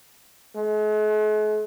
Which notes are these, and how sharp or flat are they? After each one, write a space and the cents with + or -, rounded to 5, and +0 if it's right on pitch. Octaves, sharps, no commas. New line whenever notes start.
G#3 +45